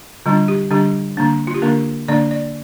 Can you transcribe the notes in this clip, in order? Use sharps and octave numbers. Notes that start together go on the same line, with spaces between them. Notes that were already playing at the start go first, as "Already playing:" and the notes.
D3 G3 D4 F4
G4
D3 G3 D4 G4
D3 A#3 D4
F4
G4
D3 A#3 D4 A#4
D3 A#3 D4 D5
D5